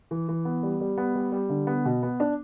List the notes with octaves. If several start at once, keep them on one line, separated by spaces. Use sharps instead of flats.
E3
E3
B3
G3
G3
B3
G3
G3
D3
B3
B2
B3
D4